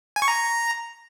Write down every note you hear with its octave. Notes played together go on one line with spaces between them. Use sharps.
G#5
C#6
A#5